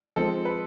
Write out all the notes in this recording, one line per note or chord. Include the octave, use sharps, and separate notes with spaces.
F3 G#3 C4 A4
B4